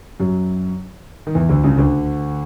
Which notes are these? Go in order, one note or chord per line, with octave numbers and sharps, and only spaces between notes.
F#2 F#3
D#3
E2 E3
D2 D3
C#2 C#3
D2 D3